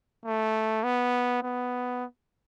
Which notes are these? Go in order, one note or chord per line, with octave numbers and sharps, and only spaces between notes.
A3
B3
B3